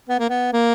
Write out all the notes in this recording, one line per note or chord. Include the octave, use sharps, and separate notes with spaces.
B3
A#3
B3
A#3